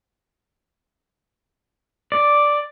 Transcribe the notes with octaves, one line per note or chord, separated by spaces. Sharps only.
D5